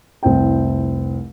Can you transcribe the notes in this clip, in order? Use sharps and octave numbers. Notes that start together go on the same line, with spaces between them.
F1 C2 C4 E4 G5